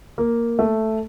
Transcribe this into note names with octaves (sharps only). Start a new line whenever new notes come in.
A#3
A3